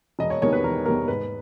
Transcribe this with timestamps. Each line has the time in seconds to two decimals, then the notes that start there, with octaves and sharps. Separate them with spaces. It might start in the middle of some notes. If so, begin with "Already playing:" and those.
0.19 E1 D#5
0.30 C#5
0.42 E2 D#3 G3 A#3 C#5
0.53 B4
0.64 E1 A#4
0.86 E2 D#3 G3 A#3 A#4
1.08 G#2 B4